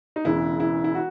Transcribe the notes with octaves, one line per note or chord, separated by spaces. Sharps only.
D#4
E1 E2 C#3 E3 E4
E4
E4
F#4